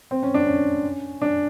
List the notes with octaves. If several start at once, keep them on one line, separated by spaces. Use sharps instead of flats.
C4
C#4
D4
C#4
D4